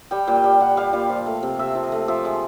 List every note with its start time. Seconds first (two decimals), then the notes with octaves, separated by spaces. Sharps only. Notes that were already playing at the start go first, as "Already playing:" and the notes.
0.11 G3 G5
0.28 A#2
0.36 G5
0.44 G3
0.60 A#2 F#5
0.77 G3 F5
0.93 A#2 F5
1.09 F3
1.26 A3
1.43 C3
1.59 C3 E5
1.75 F3
1.83 D#5
1.92 A3
2.08 F3 E5
2.25 G#3